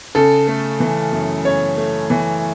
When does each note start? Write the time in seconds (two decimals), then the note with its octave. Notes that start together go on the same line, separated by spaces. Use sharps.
0.15 C#3 A4
0.48 A3
0.80 E3
1.12 F#2
1.45 C#3 C#5
1.77 A3
2.10 E3